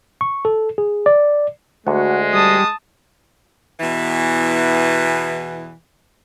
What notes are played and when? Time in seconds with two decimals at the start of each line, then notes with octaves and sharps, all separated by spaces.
0.21 C#6
0.45 A4
0.78 G#4
1.06 D5
1.87 D2 G#3 F#4
2.33 G3 A5 D#6
3.79 E2 B2 E3